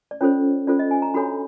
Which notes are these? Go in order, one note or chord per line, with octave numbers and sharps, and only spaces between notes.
D5
C#4 F4 A4 C5 C#5
C#4 F4 A4 C5 D5
D#5
G#5
A#5
D4 F#4 A4 C#5 B5